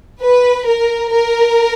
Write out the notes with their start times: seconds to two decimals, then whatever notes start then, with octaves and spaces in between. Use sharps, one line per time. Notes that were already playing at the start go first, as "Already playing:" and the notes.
0.22 B4
0.66 A#4
1.13 A#4